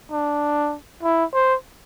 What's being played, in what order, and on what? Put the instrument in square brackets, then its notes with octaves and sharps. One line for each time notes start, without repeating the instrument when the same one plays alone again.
[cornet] D4
E4
C5